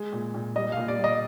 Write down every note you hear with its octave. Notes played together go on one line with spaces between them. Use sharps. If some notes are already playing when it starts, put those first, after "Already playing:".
Already playing: G#3
A#2
A#2
G3 D#5
A#2 F5
D5
G3
D#5